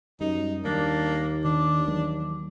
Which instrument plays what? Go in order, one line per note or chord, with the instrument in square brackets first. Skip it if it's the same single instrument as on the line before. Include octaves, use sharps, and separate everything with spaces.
[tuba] F#2 [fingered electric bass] G3 [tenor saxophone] D#4
[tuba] D#2 [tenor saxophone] A#3 [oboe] D4
[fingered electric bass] D#3 [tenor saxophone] D4 [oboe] D6
[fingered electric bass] E3 F#3 A#3